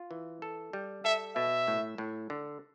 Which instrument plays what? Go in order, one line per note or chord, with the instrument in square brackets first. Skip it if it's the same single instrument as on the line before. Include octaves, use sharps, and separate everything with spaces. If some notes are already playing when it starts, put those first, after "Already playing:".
Already playing: [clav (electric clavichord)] F4
E3
A4
G3
[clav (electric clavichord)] A4 [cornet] E5
[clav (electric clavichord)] B2 [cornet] E5
[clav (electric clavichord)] A2
A2
D3